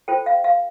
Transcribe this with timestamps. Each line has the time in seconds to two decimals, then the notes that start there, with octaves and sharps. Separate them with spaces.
0.08 F4 A4 C5 G5
0.26 F5
0.44 F5